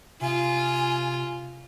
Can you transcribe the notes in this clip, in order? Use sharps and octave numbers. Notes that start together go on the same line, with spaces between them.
C3 F4 G#5